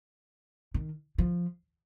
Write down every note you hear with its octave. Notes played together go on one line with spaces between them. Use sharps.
D#3
F3